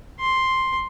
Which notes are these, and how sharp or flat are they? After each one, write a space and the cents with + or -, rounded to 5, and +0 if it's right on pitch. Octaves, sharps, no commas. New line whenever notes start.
C6 +5